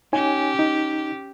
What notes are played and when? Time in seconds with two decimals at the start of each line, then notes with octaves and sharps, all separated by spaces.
0.13 C#4 D#4 G4 C#5 G#5
0.59 D#4